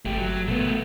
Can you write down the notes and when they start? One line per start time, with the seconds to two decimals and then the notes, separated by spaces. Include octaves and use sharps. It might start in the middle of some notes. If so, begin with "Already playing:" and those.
0.05 G1 A3 G4
0.18 F#3
0.48 B2 A3 B3